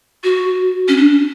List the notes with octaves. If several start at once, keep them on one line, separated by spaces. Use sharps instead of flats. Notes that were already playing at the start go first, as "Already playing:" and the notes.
F#4
C#4
D4